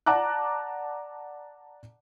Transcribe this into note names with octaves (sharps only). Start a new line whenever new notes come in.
D5 F#5 A5 A#5 D6 F#6